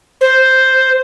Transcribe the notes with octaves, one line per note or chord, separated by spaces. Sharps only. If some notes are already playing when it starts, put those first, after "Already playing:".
C5